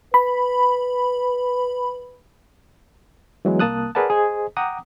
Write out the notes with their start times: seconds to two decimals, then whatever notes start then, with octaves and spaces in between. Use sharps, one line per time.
0.14 B4 B5
3.45 E3 F#3 G#3 B3
3.59 C2 A#3 A5 D#6 F#6
3.95 G#4 A#4 B4 D5 F#5 A5
4.10 G#4 C5 D#5
4.57 F#5 G5 A#5 D6 D#6